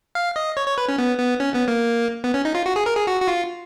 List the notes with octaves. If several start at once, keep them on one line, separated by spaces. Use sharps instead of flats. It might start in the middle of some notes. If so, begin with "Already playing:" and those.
F5
D#5
C#5
C#5
B4
C#4
B3
B3
C#4
B3
A#3
B3
C#4
D#4
F4
F#4
G#4
A#4
G#4
F#4
F#4
F4